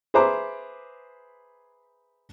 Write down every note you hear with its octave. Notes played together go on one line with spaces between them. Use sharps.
G#4 B4 C5 E5 A#5 D6